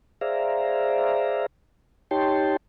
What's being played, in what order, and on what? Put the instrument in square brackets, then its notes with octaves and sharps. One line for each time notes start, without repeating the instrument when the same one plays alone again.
[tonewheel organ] G#4 C5 D5 E5 F5 A#5
D#4 G4 C#5 G5 A5 C6